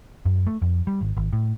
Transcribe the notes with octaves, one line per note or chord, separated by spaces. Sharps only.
F#2
A3
F2
G3
G#1
G#1
A2